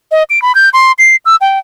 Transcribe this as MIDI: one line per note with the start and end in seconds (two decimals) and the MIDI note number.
0.12 0.23 75
0.30 0.42 98
0.42 0.55 83
0.55 0.70 91
0.73 0.92 84
0.99 1.16 96
1.25 1.36 88
1.41 1.59 79